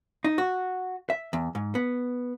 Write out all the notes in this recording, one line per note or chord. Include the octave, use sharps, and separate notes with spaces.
D#4
F#4
E5
E2
G#2
B3